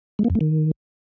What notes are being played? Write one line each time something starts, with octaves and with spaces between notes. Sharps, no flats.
G#3
A#3
F2
A3
D#3